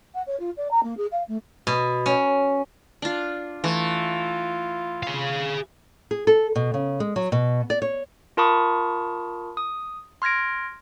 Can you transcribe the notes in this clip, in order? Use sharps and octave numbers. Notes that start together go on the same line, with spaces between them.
F#5
C#5
F4
D5
A#5
A#3
G#4
F5
A3
B2
C#4
D4 F4
E3 A3 F4
G#4 F5
G#4
A4
B2
C#3
G#3
F#3
B2
D5
C#5
F4 A#4 A5 B5 C#6 D#6
D#6
C6 F6 G#6 A#6 D7